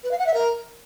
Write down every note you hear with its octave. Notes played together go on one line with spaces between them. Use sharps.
B4
F5
F#5
E5
A#4